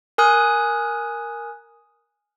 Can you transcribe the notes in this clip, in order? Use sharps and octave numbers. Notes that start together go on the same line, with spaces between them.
A#4 G#5 D#6 F#6